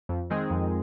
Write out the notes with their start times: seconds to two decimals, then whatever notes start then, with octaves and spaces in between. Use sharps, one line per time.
0.09 F2
0.30 D#3 G#3 C4 G#4
0.50 F2